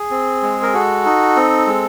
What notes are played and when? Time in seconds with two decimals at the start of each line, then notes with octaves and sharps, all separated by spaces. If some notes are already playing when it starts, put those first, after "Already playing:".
Already playing: G#4
0.11 C4
0.42 G#3
0.63 A#4
0.73 F#4 A4
1.05 D#4
1.36 C4
1.67 G#3